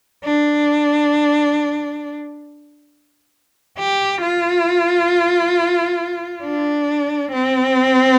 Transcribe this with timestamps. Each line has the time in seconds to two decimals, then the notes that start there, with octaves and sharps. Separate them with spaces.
0.24 D4
3.79 G4
4.22 F4
6.43 D4
7.32 C4